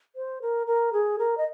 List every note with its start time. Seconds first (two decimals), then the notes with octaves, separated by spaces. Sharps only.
0.16 C5
0.42 A#4
0.67 A#4
0.93 G#4
1.19 A#4
1.37 D#5